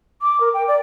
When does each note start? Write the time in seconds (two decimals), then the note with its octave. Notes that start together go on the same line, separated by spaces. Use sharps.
0.22 D6
0.40 A#4
0.54 G5
0.68 D5